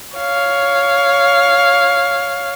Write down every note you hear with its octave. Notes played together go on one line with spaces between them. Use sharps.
C#5 F5